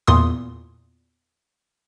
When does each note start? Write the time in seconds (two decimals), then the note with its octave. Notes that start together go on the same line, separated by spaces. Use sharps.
0.07 E2 A#2 C6 D#6